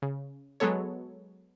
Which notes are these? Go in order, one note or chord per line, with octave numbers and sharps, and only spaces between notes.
C#3
F#3 G#3 B3 A4 C#5